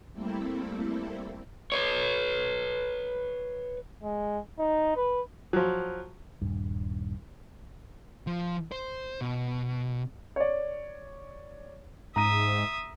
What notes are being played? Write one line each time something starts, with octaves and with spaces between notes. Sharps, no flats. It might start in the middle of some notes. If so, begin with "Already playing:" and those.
G3 A3 A#3 C4 E4 A4
B4 C#5
G#3
D#4
B4
F3 F#3
D#1 G2
F3
C5
B2
C#5 D5
G#2 E5 A#5 D#6 D#7